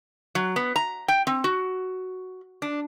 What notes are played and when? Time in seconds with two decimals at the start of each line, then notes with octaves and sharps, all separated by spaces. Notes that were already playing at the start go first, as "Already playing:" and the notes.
0.35 F#3
0.56 B3
0.76 A#5
1.08 G5
1.27 C4
1.44 F#4
2.62 D4